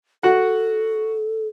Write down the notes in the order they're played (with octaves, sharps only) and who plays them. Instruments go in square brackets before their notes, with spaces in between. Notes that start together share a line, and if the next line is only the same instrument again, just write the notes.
[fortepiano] F#4 F#5 [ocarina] A4